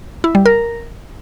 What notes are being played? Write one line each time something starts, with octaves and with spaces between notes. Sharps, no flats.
E4
G3
A#4